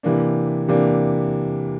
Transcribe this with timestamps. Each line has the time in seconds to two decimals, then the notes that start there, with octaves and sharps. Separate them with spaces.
0.03 C3 E3 A#3 D4
0.68 C3 E3 A#3 D4